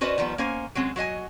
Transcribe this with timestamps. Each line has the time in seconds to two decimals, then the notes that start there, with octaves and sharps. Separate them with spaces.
0.01 C#4 F#4 B4 C5 D5 D#5
0.18 D#3 F3 G3 B3
0.38 A#3 C#4 C5 G#5
0.75 F#3 G#3 C4 C#4
0.96 F#3 F#4 D#5 G#5